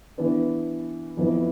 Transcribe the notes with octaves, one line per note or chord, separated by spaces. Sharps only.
E3 B3 D4
F2 E3 B3